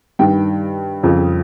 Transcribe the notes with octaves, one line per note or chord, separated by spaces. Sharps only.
G2 D#3 G5
F2 C#3 F3